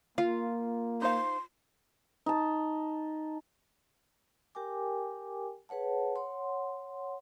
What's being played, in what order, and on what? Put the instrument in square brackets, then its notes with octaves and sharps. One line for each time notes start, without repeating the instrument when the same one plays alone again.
[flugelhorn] A#3 [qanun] F4 [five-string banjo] F5
[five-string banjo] D#4 C5 F5 [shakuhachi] C6
[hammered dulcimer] D#4 A5
[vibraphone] G4 A#4 G5 G#5 D6
G#4 B4 C#5 F#5 A5
C#5 F#5 C6